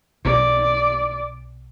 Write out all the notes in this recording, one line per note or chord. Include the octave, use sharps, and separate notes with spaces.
B1 D5